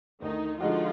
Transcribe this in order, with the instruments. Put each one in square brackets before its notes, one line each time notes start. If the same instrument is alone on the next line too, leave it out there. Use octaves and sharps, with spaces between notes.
[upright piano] D2 [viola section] D#3 D#4
[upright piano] D3 G#3 D#4 F#4 [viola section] F3 F4